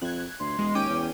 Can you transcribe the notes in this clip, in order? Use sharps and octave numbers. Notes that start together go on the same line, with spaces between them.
F2 F#6 G#6
D2 C6
E1 G#3
D#2 C#4 G5 D6 D#7
E2